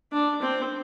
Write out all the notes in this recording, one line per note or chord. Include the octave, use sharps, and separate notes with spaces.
D4
C4